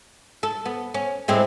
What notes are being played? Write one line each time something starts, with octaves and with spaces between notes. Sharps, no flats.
A4
B3
C#4
A2 G#3 C4